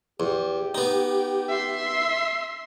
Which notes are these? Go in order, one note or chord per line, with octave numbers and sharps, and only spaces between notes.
E2 G4
B3 D#4
E5 C6